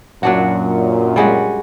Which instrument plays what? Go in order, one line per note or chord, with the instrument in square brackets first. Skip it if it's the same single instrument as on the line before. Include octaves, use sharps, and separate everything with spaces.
[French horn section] F#2 A#2 [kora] F#3 D4 F#4
[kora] G3 G#3 F#4